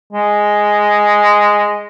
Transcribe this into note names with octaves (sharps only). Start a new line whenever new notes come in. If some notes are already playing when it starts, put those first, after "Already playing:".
G#3